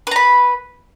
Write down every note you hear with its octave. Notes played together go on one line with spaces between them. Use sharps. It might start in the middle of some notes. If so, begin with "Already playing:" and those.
B4 A#5 B5